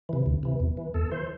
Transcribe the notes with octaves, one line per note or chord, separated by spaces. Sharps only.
C3 E3
D2
C3 E3
E2
E3
E2 A4
E3 C5